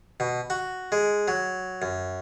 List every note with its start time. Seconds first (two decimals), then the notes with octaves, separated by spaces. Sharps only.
0.20 B2
0.50 F#4
0.92 G#3
1.28 F#3
1.82 F#2